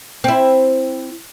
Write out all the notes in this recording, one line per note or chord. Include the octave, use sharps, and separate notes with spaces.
C4 E4